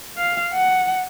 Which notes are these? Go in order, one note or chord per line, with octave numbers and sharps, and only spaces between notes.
F5
F#5